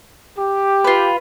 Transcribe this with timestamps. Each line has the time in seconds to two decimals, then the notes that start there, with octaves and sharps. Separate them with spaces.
0.38 G4
0.84 F4 B4